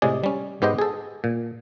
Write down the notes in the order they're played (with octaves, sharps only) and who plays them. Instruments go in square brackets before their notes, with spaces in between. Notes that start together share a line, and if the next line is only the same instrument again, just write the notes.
[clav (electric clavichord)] A2 C3 G#3 G#4 D5
G3 C#4
G#2 B3 G4 C5 D#5 G5
G#4 A4
A#2